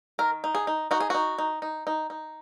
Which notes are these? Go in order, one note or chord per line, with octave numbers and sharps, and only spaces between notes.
D#3 A#4
D#4
G#4
D#4
D#4 F#4
G#4
D#4 F#4
D#4
D#4
D#4
D#4